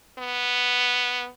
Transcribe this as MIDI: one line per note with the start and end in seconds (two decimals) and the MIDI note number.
0.19 1.28 59